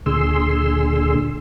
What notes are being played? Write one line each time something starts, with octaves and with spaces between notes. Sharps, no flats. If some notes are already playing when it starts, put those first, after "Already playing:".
D2 A#2 D3 G#4 C6 E6